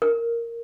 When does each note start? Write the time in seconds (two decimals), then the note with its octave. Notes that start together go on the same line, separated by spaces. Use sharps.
0.02 A#4